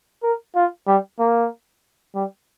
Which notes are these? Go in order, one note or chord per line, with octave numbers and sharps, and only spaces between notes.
A#4
F4
G3
A#3
G3